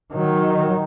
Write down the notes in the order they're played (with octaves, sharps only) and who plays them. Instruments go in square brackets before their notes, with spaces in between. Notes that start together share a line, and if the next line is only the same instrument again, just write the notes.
[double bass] D#3 F#3